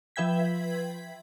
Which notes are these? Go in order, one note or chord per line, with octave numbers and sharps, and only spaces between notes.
F3 B4 E5 G5 G#6 B6